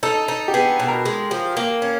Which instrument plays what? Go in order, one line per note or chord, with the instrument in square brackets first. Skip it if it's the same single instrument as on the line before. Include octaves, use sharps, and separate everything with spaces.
[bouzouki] D#4 [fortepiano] A4
[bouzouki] D#4
[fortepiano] G4
[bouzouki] B3 [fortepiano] G#4
[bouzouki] B2
[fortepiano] A#4
[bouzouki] G#3
F3
A#3
C#4